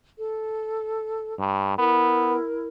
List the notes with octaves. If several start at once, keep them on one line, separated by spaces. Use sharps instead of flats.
A4
G2
B3 E4 A#4